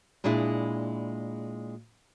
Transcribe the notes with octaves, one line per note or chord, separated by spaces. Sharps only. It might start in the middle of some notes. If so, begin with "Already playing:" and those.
A#2 G#3 D4 E4 G#4